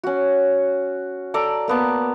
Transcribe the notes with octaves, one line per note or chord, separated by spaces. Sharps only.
C#4 F#4
A4 D5 A#5 D6
A#3 B3 A5